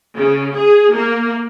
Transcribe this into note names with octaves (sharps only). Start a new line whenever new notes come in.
C#3
G#4
A#3